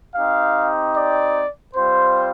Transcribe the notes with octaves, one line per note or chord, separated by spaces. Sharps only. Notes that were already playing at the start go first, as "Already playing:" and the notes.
C4 D#4 G4 F5
D5
G3 C4 F4 C5